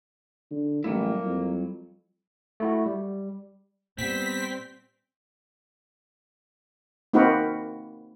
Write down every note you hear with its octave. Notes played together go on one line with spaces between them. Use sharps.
D3
A1 F#3 G3 A#3 E4
F2
A3 E4 F#4
G3
A#2 G3 B3 C4 B6
A#3 C4 D#4 F#4 A#4 B4